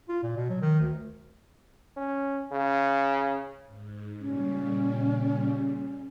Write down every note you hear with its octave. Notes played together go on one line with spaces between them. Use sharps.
F4
A#2
B2
F#3
D#3
D2
C#4
C#3
G#2
A#2 C#3 G3 C#4